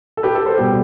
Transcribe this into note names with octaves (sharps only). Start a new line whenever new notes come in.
A4
G4 B4
A4
A4 C5
B2 G3 B3 G4